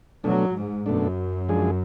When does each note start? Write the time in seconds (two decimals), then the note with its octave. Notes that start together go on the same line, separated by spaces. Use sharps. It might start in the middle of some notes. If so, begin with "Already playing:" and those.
0.24 B2 F#3 A3 D4
0.55 G#2
0.86 F#2 B2 A3 D4
1.49 F3 G#3 D4 G#4